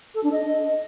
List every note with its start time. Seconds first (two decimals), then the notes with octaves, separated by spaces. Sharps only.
0.15 A4
0.23 D4
0.32 D#5